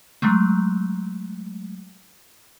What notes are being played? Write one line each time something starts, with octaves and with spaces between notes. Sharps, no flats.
F#3 G#3 A3